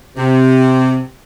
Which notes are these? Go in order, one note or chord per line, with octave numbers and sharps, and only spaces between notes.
C3